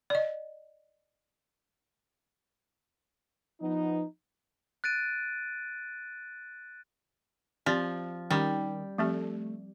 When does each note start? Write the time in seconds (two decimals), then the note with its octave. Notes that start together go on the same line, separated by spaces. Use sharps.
0.10 D5 D#5
3.61 F3 B3 D#4
4.84 F#6 A6 D7 D#7
7.66 F3 C4 G4 D5
8.30 D#3 G3 C#4 G4 G5
8.98 F3 A3 C4 G4